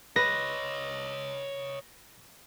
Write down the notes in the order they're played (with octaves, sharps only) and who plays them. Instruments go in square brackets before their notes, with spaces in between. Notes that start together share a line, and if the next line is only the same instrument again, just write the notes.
[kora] B4 [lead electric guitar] C#5 D#5 [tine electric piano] A#6